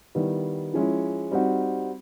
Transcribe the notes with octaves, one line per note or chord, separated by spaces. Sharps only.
D#3 G3 B3 E4
F3 G#3 C#4 E4
G3 C4 D#4 F#4